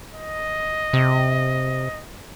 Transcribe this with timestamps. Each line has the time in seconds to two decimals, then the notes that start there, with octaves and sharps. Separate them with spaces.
0.15 D#5
0.93 C3